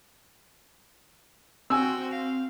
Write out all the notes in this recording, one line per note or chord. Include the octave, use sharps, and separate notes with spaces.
C4 F#4 G5 G#5 E6
F5